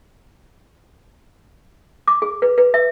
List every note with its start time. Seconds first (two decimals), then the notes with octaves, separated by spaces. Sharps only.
2.08 D6
2.22 G#4
2.42 B4
2.58 B4
2.74 E5